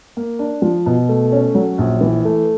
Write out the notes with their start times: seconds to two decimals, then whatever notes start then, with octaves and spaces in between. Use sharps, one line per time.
0.17 A#3
0.39 D4
0.62 F3
0.86 B2
1.09 A3
1.32 C#4
1.55 F#3
1.78 A#1
2.01 E3
2.25 A3